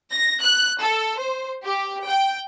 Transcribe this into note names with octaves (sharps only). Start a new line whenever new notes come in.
A#6
F#6
A4
C5
G4
G5